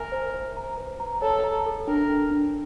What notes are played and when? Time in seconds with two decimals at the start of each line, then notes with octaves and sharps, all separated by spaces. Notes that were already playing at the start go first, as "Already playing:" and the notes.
Already playing: A#4 E5 G#5
0.12 C5
0.34 C5
0.57 A#5
0.78 B4
1.00 A#5
1.22 A4 C#5
1.44 A#5
1.66 A4
1.87 D4 A#4
2.10 D4
2.31 D4